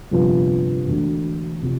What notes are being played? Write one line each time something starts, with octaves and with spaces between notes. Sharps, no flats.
G1 F2 C3 F3 B3
E1 D2 D3
C3 F3